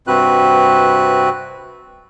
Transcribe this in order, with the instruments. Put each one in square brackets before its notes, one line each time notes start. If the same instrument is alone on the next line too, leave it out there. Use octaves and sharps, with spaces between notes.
[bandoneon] G2 C3 C4 F#4 B4 F#6